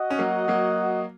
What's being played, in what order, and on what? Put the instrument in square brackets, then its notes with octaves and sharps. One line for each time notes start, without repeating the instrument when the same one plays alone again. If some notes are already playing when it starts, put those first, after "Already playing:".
Already playing: [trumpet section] F#4 D#5 F#5
[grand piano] C#4
F#3 A#3
F#3 A#3